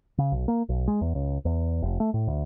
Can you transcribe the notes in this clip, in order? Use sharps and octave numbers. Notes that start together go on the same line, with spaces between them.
C#3
B1
A#3
B1
G#3
E2
C#2
E2
F1
A3
A2
D2